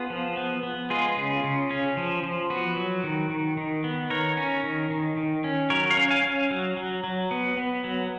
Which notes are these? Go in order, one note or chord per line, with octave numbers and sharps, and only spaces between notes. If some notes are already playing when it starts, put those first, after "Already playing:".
Already playing: B3 F4 G#4
F3
B3
B3
G#3 F4 G#4
C#3
C#3
C#4
F3
F3
B3 F#4
F#3
D#3
D#3
D#3
B3
D#3 A#4 C#5
C#4
D#3
D#3
D#3
C#4
F#3 A#4 C#5
C#5 F5
C#4
F5 G#5
C#4
F#3
F#3
F#3
B3
B3
F#3